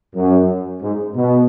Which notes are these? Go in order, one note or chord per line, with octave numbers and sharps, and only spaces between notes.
F#2
G#2
B2